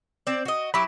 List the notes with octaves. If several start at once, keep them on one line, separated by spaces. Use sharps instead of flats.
C4 D5
F#4 D#5
F#3 E4 G4 B5